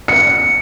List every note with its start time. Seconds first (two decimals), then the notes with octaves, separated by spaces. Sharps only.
0.08 C#7